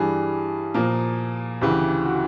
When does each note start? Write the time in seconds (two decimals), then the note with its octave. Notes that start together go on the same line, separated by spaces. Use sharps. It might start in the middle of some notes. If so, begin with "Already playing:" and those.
Already playing: G2 E3 G3 G#4
0.74 A#2 F3 A#3
1.61 D2 C#3 E3 G4
2.05 F#4